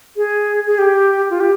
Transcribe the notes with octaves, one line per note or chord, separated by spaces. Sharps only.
G#4
G#4
G4
F4
G4